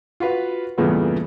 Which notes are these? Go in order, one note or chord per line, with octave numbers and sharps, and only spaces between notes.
F4 F#4 B4 F5
E2 G2 A#2 C#3 A3 B3